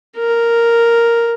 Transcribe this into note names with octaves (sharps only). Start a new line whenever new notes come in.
A#4